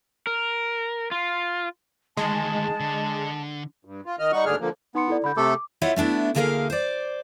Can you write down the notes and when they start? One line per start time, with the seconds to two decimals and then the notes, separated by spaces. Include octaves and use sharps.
0.27 A#4
1.11 F4
2.17 D2 D#3 G#3 A5
2.80 D3
3.85 G2
4.06 F4
4.19 D#3 D#5 F6
4.32 G3 D#4 F#5 C#6
4.45 D#2 G#2 D3 D4 G#4 F6
4.60 D3 F3 A#3
4.95 B3 D#4 C6 C#7
5.08 E4 A4 D5
5.24 D3 B5 G6
5.37 C3 A3 A4 D6
5.82 E4 F4 C#5 D#5 E5 F#5
5.96 A3 B3 D4 E4
6.35 D2 D3 A#3 G#4 A#4 F5
6.70 C5 D5